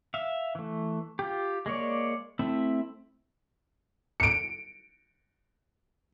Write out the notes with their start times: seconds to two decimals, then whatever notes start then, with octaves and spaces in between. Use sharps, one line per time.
0.14 E5 F5
0.55 E3 A3
1.19 F4 G4
1.66 G#3 A#3 C#5 D5
2.39 A3 C4 E4 E5
4.20 C#7 D7